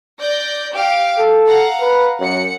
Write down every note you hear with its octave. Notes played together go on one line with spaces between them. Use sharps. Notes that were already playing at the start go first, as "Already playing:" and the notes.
D5 G6 A#6
G4 F5 D7
A4
F5 F#5 A#5
B4
F#2 F#5 C#7